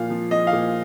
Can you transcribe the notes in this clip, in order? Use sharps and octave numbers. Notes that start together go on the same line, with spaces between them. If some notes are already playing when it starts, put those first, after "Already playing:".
Already playing: A#2 F3 F5
F3
F3 D#5
F5
A#2